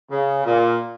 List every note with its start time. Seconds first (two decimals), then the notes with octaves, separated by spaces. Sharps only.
0.11 C#3
0.45 A#2